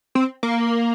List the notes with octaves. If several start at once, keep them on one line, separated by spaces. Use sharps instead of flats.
C4
A#3